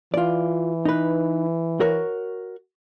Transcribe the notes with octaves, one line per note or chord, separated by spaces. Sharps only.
E3 F4 D5
D#4 B4
F#4 A#4 C#5